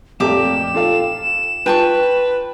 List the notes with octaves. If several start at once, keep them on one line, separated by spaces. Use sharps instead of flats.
F2 A#2 A3 G4 D6 E7
F4 A4 F5
F4 B4 G5 A5 C#6